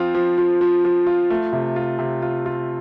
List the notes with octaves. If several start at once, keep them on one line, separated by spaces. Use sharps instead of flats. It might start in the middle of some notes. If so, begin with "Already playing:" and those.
Already playing: F3 C4 F4
F3
F3
F3
F3
F4
A3
C3
F4
C3
F4
F4